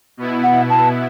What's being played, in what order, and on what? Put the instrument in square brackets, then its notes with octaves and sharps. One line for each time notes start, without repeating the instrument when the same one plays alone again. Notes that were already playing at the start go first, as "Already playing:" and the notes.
[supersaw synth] B2 B3 E4
[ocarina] F#5
A5